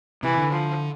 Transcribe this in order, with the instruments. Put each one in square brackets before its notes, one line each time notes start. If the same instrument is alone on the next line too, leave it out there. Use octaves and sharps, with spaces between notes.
[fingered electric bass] C3 [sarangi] E3
[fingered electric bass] D3
[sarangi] F3